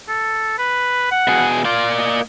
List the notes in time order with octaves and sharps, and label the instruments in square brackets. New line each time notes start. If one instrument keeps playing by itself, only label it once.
[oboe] A4
B4
F#5
[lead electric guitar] B2 G#4
[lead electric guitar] A#3 D5 [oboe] F4
[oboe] D#5